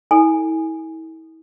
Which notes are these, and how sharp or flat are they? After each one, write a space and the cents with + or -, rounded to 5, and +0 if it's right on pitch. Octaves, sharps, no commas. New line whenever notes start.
E4 -40 A4 +15 G#5 +0